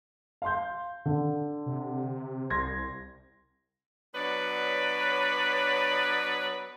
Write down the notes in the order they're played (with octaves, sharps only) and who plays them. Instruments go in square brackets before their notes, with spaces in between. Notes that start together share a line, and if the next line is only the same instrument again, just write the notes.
[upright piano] F5 C6 G6
D3
[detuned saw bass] C3
[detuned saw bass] C2 [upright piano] C6 G#6 A#6
[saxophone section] F#3 B3 D4 B4 C#5 D5